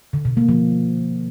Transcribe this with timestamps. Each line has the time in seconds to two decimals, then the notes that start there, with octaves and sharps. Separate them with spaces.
0.13 D3
0.25 B2
0.37 A#3
0.49 F3